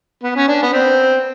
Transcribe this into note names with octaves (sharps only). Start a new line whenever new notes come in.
B3
C#4
D4
B3
C4